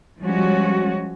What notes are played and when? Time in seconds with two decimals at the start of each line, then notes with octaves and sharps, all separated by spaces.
0.22 F3 G3 G#3 C#4 F#4